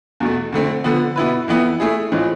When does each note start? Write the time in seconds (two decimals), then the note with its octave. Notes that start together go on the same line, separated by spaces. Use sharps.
0.20 E2 B2 A3
0.52 F2 D3 A3 C4
0.84 D3 F3 B3
1.16 B2 B3 E4 B4
1.48 F2 E3 B3 E4
1.80 A3 E4 G#4
2.12 A2 E3 G#3 C4 F4